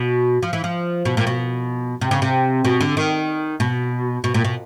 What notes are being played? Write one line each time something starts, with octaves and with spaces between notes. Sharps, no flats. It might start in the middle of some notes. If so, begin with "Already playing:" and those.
Already playing: B2
F3
E3
F3
B2
A#2
B2
C3
C#3
C3
B2
D3
D#3
B2
B2
A#2
B2